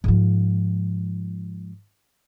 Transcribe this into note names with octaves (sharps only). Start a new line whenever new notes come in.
G#2 F3